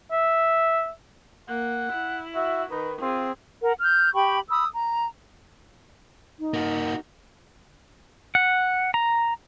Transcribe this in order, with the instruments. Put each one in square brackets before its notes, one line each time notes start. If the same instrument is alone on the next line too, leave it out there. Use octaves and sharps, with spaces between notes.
[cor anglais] E5
[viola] A#3 [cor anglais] F#5
[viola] E4
[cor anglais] F#4 [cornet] E5
[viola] D#3 [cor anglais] D#4 [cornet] B4
[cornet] C4 [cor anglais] F4 [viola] G#4
[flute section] A#4 F#5
F6 G6
G4 G5 B5 C#6
B5 D#6 E6
A#5
[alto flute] D#4
[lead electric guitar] A#3 F#4
[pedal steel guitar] F#5
A#5